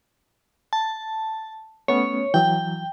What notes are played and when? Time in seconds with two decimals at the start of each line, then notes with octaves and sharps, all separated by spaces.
0.73 A5
1.88 A3 B3 C#4 C#5
2.34 E3 F#3 G5